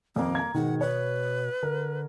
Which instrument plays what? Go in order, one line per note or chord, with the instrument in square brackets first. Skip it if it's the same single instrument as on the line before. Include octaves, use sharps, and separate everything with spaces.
[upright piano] D#1 F2 [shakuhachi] A#3
[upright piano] A#5 G#6
[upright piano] G#2 D#3 [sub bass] B2 [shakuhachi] F#5
[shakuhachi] B4 [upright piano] C#5
[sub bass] D3 [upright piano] A#4